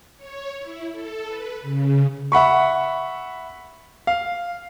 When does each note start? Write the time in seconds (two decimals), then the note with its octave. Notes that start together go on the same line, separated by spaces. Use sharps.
0.17 C#5
0.60 E4
0.92 A4
1.28 B4
1.62 C#3
2.32 E5 F#5 B5 C#6
4.07 F5